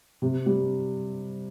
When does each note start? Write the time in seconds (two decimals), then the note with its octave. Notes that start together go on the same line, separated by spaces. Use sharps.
0.22 C3
0.46 G3